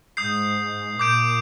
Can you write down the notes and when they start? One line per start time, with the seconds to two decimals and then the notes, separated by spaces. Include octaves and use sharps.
0.17 G#2 D#6 G6 C7
0.99 A#2 D6 G6 D7